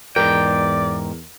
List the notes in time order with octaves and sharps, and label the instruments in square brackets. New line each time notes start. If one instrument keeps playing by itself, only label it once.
[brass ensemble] E2 [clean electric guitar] G#2 G5 [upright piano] A#4 [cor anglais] D5